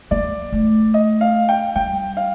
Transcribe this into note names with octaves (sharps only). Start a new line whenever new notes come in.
A#3 D5
A3
D#5
F5
G5
G3 G5
F5